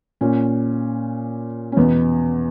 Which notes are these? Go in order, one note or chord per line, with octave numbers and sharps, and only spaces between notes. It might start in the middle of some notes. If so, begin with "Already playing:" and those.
A#2 C#4
C#4
E2 B2 B3